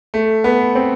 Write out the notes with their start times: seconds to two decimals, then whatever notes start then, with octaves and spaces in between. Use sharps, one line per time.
0.14 A3
0.44 B3
0.75 C4